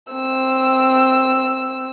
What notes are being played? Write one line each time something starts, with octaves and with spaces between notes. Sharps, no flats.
C4 E6